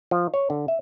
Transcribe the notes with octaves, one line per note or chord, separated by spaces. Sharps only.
F3
C#5
D3
E5